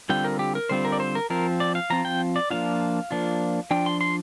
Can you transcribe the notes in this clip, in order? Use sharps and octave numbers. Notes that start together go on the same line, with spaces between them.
D3 G3 C4 F4 G5
A#4
G4
A#4
D3 G3 C4 F4 C5
A#4
D5
C5
A#4
F3 C4 F4 A#4
D5
F5
F3 C4 F4 A#5
G5
D5
F3 A#3 D4 F4 F5
F3 A#3 D4 F4
F3 D4 F4 G5
C6
C6